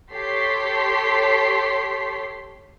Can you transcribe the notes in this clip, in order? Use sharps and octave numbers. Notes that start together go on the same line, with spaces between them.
G4 A4 C#5 C6 B6 C7